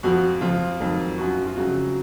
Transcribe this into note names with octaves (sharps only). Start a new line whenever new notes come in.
F2 F3 F#4
F2 F3 F4
F2 D#3 F#3
F#2 F3 F#4
F4
F2 C#3 F#3 F#4